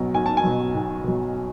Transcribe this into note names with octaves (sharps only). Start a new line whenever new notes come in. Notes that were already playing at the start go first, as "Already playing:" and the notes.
Already playing: B1 B2 F#3
B1 G#5
A5
G#5
B2 F#3
B1
B2 F#3